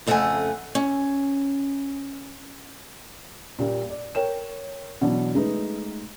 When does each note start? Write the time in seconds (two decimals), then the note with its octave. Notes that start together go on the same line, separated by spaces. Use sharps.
0.06 F2 C#3 A3 D#4 F#5 G#5
0.75 C#4
3.59 A#2 G3 A#3
3.90 D5
4.15 A#4 C#5 G5 E7
5.01 B2 E3 F#3 D4
5.35 G#3 A3 D#4 B4